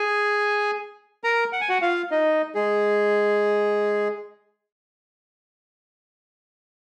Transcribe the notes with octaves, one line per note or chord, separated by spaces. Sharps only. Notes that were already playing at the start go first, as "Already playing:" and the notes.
Already playing: G#4 G#5
A#4 A#5
F#5
G#5
F#4 F#5
F4 F5
D#4 D#5
G#3 G#4